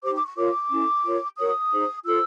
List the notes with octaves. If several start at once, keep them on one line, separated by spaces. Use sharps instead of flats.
D#4 G4 C5 D6
D6
C#6
F4 A#4 C#5 D6
C#4 E4 A4
F4 A#4 C#5
F#4 A#4 C#5 D#6
D#4 G#4 C5
F4 A4 C5 E6